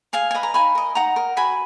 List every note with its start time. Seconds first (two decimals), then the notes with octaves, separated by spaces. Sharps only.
0.13 G#4 F5 G#5
0.31 B4 D#5 G#5
0.43 A#5
0.54 D#4 G#5 B5
0.75 A#4 D#5
0.95 D#4 F#5 A#5
1.16 A#4 D#5
1.37 F#4 G#5 B5